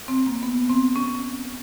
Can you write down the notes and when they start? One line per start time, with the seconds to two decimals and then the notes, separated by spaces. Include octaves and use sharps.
0.08 C4
0.26 A#3
0.43 B3
0.70 C4
0.96 C#4